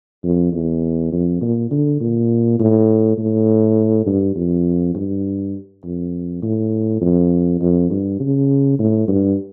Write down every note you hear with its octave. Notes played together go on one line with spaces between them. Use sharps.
F2
E2
F2
A#2
D3
A#2
A2
A2
G2
F2
G2
F2
A2
F2
F2
G2
C#3
A2
G2